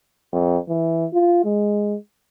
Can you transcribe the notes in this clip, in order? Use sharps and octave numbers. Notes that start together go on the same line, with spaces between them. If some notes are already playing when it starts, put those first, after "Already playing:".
F2
E3
F4
G#3